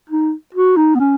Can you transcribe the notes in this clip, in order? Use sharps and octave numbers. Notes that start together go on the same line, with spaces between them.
D#4
F#4
D#4
B3
C#4